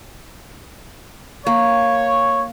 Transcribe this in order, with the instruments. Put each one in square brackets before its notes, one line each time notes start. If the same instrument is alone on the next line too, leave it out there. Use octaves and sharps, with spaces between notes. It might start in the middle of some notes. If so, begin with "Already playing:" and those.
[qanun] A#3 [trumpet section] C#5